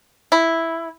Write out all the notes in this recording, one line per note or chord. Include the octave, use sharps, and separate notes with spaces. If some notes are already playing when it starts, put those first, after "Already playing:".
E4